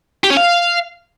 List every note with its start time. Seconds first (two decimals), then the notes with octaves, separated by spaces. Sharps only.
0.24 G4
0.30 C#4
0.37 F5